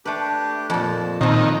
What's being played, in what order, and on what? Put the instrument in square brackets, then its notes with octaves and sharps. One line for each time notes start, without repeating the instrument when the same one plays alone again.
[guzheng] A3 B4 [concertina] D4 G4
[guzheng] F2 A#2 [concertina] A5
[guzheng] F2 C5 [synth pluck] A#2 C4 [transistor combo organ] D#3 [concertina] B4